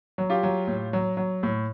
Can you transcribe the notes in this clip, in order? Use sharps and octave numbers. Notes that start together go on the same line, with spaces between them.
F#3
F4 G4
F#3
A2
F#3
F#3
A2